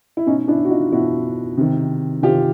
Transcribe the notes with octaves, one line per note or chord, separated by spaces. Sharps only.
E4
B2 C#4 D#4
D4 E4
F#4
D#4 F4
B2 E4 F#4
C3 D#3
C3 D#3 F4 G4